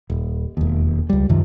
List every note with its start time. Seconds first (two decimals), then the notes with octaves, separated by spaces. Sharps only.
0.10 D#1
0.57 E1 D#2
1.10 C#2 G3
1.29 F#2 C3 D#3 F3